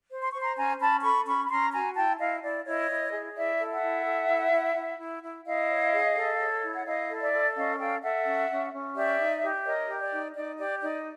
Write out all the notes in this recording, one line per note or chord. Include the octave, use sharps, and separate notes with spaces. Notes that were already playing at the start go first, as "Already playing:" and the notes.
C5
C6
C5 C#6
A#5 C6
C#4 G#5 A#5
C#4 A5 B5
A4 B5 C#6
C#4 B5 C#6
B5
C#4 A#5 C6
F#4 G#5 A#5
E4 G5 A5
E4 D#5 F5
E4 D5
E4 C#5 D#5
E4
G#4
E4 D5 E5
A4
E5 F#5
E4
A4
E4
E4
E4
E4
E4
E4 D#5 F5
C#5
G#4
A4
C#5
E4
F#5
E4 D#5 F5
A4
D5 E5
A4
C#4 D#5 F5
A4 F5 G5
A4 E5 F#5
C#4
C#4
C#4
G4 D5 E5
D#4
G4
A#4 C#5 D#5
G4
D5
D#4
D#4 D5
G4 D5
D#4 D5